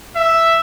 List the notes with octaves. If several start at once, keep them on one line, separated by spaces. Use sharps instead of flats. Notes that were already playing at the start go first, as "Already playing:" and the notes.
E5